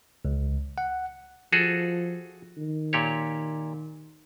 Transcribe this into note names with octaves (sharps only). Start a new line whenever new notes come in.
C#2
F#5
F3 F#4 G#4 A4
D#3
A#2 G4 C#5